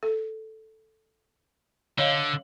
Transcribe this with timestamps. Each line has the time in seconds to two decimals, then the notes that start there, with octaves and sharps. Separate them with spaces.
0.03 A4
1.99 D3 C#5 D#5 F5